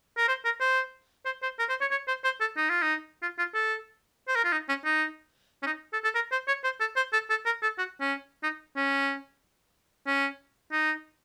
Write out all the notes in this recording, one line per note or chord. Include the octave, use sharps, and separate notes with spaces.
A#4
C5
A#4
C5
C5
C5
A#4
C5
C#5
C#5
C5
C5
A4
D#4
F4
D#4
F4
F4
A4
C5
A#4
F4
D#4
C#4
D#4
C#4
D#4
A4
A4
A#4
C5
C#5
C5
A4
C5
A4
A4
A#4
A4
F#4
C#4
D#4
C#4
C#4
D#4